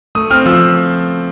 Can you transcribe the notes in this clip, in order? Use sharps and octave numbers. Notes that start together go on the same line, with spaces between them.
A3 D#6
C4 F6
F3 E6